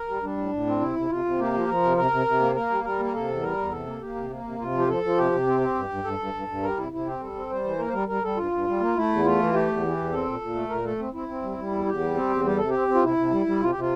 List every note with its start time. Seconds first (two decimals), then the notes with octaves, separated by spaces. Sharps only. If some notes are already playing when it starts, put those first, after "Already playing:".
Already playing: A#4
0.08 G3
0.22 G3 D4
0.37 A2
0.52 A2
0.67 C4
0.80 C3 E4
0.96 C3
1.09 C3 F4
1.25 C3
1.39 A#3 G4
1.54 F3
1.67 F3 A#4
1.83 C3
1.97 C3 A#4
2.11 C3
2.27 C3
2.40 A#3
2.55 A#3 A#4
2.70 G3
2.84 G3 A#4
2.99 A#3
3.05 A#4
3.14 C3 A4
3.28 E2
3.42 G3 A#4
3.57 E2
3.71 C3 A4
3.86 A#3
4.01 A#3 G4
4.15 C3
4.30 A#3
4.44 C3
4.58 C3 F4
4.73 F3
4.78 G4
4.88 F3 A4
5.03 F3
5.17 C3 G4
5.32 C3
5.47 C4
5.61 C4
5.75 G2
5.89 G2
6.04 G2 A4
6.19 G2
6.34 G2
6.48 G2
6.63 G3 A#4
6.77 C3 E4
6.92 C3 E4
7.06 C4 G4
7.20 G3 A4
7.35 C4
7.50 G3 C5
7.64 E3
7.78 A#3 A#4
7.88 C5
7.93 G3 A#4
8.08 G3 A#4
8.23 G3 A4
8.37 G2 F4
8.51 G2
8.67 G3
8.80 A#3
8.96 A3 E4
9.10 E2
9.24 A3 F4
9.39 E3
9.53 A3 G4
9.68 E2
9.83 E3
9.97 E2
10.12 C4 A4
10.27 A#2
10.41 A#2
10.55 A3
10.69 A#2 A#4
10.85 A3 A4
10.99 C4
11.13 C4 E4
11.28 C4
11.42 G3
11.58 G3
11.71 E2
11.86 E2 G4
12.00 G3
12.15 C4
12.29 E2
12.44 G3 G4
12.57 C3 A4
12.69 C4 G4
12.88 C4
12.95 F4
13.03 C3 E4
13.17 C3
13.31 G3
13.46 G3
13.60 C3 F4
13.71 G4
13.75 C3 F4